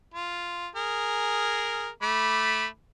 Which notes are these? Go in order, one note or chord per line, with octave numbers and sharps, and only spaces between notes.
F4
G#4 A#4
A3 B5 D6